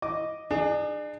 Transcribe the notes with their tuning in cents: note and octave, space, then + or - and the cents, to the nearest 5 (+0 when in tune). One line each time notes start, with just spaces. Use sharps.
D#5 +0 D6 +0
D4 +35 G#4 +0